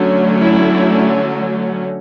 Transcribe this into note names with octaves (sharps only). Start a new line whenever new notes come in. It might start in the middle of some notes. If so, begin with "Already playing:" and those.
Already playing: D3 F#3 A3 C#4
E4